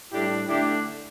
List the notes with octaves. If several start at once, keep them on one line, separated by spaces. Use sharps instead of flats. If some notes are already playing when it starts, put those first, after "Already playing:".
A2 G3 D4 E4 G4
D3 A3 D4 E4 G4